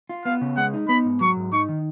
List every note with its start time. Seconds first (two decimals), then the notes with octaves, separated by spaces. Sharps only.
0.09 F4
0.25 B3 F5
0.41 C#3
0.57 G#3 F#5
0.73 D#4
0.89 B3 B5
1.05 G#2
1.21 F#3 C#6
1.37 G#2
1.52 D#4 C#6
1.69 D#3